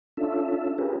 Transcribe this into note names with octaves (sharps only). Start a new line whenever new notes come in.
C#4 D4 F4 A4 E5
C#4 F4 G4 G#4 A#4 B4